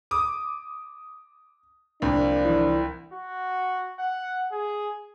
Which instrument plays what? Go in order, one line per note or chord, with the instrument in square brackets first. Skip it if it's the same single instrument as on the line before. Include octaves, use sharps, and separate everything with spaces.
[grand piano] D6 D#6
[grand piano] C2 [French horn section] F3 A#3 D4
[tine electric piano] E3 E4
[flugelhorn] F#4
F#5
G#4